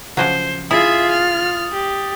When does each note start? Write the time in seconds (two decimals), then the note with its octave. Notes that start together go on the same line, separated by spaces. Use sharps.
0.17 C#3 F3 F#3 C5
0.71 E4 F4 G#4 E5 D#6 A6
1.10 F6
1.72 G4